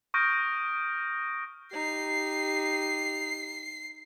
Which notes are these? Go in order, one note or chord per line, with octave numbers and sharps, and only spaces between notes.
C#6 D#6 F6 G6 A#6 D7
D#4 G4 C7